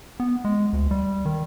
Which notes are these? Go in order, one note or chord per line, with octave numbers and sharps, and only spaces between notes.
B3
G#3
D2
G3
D#3